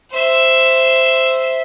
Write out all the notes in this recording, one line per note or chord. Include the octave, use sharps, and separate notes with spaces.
C5 E5